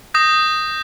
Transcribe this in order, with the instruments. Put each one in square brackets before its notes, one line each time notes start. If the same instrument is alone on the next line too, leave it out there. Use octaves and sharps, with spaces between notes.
[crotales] D#6 G6 A#6